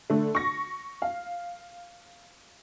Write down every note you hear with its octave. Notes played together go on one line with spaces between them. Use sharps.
D3 A3
C#6 A#6
F5